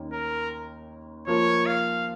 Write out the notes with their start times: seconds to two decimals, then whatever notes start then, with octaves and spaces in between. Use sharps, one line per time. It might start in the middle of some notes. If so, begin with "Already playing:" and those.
Already playing: D#2 D#3 A#3 C#4
0.12 A#4
1.27 F3 A#3 F4 A#4 C#5
1.66 F5